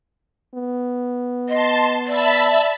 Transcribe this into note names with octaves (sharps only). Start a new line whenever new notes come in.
B3
D#5 A5 C6
D5 E5 A5 B5